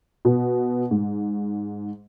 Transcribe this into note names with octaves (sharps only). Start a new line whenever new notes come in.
B2
G#2